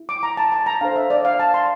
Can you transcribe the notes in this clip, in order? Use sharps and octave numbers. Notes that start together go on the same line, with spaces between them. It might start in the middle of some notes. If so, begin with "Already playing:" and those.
Already playing: E4
D6
A#5
A5
A5
A#5
D4 A4 C5 F5
E5
D5
F5
A5
C6